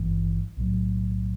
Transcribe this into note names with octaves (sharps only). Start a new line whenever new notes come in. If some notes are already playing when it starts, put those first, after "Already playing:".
Already playing: G#1 G2 E3
B1 A2 F#3